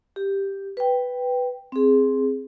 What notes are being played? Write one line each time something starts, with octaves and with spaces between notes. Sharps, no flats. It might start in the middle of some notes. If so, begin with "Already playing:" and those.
G4
B4 G5
C4 G#4